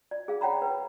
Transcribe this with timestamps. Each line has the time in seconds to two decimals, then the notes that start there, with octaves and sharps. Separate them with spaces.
0.11 D5
0.28 G#4 F5
0.41 C#5 F#5 G5 A#5 B5
0.62 B4